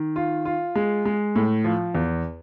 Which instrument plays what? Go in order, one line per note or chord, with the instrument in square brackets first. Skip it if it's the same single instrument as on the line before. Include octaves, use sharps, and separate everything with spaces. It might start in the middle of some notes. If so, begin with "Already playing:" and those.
Already playing: [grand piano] D#3
F4
F4
G#3
G#3
A2
F3
E2